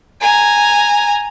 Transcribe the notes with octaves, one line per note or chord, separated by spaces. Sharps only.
G#5 A#5